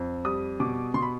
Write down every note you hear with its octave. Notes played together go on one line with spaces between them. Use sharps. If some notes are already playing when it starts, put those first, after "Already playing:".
Already playing: F2
G3 D#6
B2 D6
B2 C6
B5